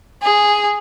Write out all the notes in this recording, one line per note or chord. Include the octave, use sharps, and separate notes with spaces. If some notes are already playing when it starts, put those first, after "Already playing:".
G#4